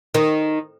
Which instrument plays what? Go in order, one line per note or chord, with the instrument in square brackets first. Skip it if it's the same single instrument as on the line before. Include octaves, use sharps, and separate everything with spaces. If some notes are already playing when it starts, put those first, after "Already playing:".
[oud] D#3